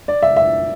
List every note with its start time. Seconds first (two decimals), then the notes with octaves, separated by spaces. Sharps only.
0.08 D5
0.23 E5
0.36 E5